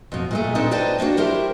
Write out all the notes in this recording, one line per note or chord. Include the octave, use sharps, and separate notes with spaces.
F2 B2
A#2 G#3 A3
C4 D4 D#4 A4 B4
B4 C5 D5 D#5 G5 A5
A#3 D4 D#4 F#4
E4 G4 A#4 C5